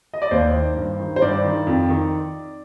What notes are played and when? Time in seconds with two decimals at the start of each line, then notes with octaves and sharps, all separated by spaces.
0.14 D#5
0.22 D5
0.31 D#2 C5
0.54 D#3
0.76 G2
1.00 D#3
1.16 C5
1.22 G2 D5
1.44 D#3
1.67 F2
1.89 D#3